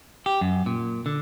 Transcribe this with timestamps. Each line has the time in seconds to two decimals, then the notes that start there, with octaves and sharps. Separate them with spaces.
0.26 G4
0.41 F#2
0.66 A#2
1.06 D3